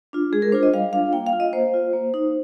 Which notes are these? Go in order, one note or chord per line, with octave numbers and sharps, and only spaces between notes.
D4 F4
G#3 G#4
A#4
D4 F4 C5
D#5
G3 F5
D4 F4 F5
A#3 G5
F5
F4
D#5
A#3 C5
F4
A#3
D#4